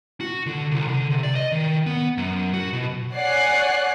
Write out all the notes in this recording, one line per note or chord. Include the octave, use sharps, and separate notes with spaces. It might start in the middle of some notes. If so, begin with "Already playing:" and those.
F#4
D3
C2
D3
C3
D5
D#5
D#3
B3
F#2
F#4
B2
C#5 D5 F#5 G#5 F#6 C7